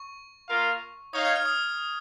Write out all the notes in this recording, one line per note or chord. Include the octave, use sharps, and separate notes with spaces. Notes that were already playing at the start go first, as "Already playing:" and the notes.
Already playing: C#6
A#3 F4 A#4 F5
D#4 C#5 F5 D#6
G#6
F6
D#6